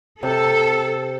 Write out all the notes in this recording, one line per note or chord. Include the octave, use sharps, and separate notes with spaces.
C3 A4